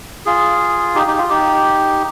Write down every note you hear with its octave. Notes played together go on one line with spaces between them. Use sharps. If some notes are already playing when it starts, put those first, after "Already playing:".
F4 G#4
D#4 G4
D#4 G4
F4
D#4 G4